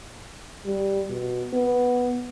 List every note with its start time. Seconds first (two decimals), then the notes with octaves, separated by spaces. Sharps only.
0.66 G3
1.09 B2
1.53 B3